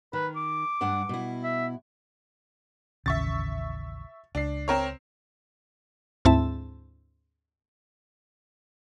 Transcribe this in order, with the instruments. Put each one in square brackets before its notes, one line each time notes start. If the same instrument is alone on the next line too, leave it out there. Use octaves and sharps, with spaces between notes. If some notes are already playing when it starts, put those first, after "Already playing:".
[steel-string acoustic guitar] D#3 [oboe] B4
[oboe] D6
[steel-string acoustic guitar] G2 D4 F#5
B2 E4
[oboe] E5
[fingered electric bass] A1 D#2 C#3 [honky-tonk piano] E5 C#6 A6
[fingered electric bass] C#2 [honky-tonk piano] D4 C7
[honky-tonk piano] C4 A#4 C#5
[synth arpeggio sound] D2 G#2 C4 E4 E5 A5